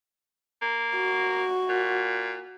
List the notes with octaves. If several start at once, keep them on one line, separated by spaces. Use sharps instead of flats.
A#3
F#4
A#2